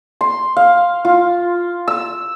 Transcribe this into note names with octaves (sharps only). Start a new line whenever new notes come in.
C6
F5
F4
E6